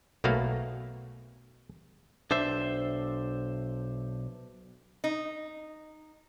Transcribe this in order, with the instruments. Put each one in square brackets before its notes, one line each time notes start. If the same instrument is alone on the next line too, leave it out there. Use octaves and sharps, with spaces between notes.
[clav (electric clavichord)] B1 B2 A3 A#3 F#4 F5
[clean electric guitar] B1 D4 C5 E5
[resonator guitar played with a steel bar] D#4